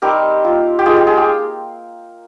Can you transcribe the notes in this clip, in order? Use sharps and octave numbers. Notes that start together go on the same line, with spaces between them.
G3 C4 D#4 G4 A#4
A#3 F4
G4
G#3 D#4 F4 G#4
G4
F4 G#4
G4